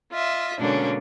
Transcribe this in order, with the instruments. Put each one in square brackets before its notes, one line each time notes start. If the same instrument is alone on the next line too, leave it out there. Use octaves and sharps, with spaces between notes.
[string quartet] F4 D#5 E5
B2 D3 G#3 A#3 C#4 D4